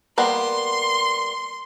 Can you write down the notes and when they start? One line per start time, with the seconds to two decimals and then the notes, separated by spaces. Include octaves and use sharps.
0.18 G3 A#3 B3 C6